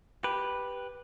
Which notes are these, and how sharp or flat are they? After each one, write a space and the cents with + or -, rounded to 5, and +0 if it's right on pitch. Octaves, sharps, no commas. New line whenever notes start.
G4 +0 B4 -5